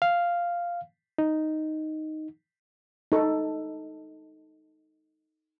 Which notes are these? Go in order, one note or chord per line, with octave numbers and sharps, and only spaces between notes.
F5
D#4
D#4 A4